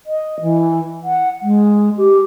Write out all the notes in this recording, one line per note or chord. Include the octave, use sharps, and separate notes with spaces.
D#5
E3
F#5
G#3
G4